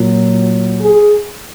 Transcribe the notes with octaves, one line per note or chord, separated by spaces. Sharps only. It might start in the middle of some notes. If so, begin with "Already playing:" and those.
Already playing: A#2 F#3
G#4